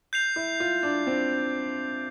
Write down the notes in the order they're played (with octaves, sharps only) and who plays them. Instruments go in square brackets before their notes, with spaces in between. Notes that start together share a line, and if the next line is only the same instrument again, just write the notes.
[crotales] G6 C7 F7
[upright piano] E4
F4
D4
C4